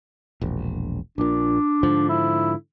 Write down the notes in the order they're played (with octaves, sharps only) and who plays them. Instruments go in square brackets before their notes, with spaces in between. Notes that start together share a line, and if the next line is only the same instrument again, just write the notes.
[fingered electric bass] E1 A#1
[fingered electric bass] A#1 A#2 [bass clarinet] D4
[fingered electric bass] G#2 D3 F3
[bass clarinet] E4